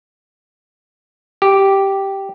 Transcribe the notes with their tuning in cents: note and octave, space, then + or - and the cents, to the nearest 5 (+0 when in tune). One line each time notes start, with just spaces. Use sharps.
G4 -5